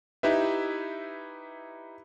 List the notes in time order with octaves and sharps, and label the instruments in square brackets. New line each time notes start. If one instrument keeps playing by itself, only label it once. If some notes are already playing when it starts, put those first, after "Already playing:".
[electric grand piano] D#4 E4 G4 B4 E5